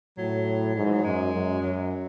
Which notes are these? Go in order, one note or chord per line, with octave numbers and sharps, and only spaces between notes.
A2 F#3
G#2 F#3
E3
F#3
F#2 G#3
F#2
F#2 F#3